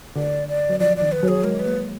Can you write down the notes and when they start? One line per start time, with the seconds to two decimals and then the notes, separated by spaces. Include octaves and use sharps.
0.16 D3 D5
0.48 D5
0.69 F#3
0.80 F3 D5
0.97 D#3 D5
1.12 B4
1.23 F#3
1.28 G#4
1.44 G#3 A#4
1.60 B4
1.66 A#3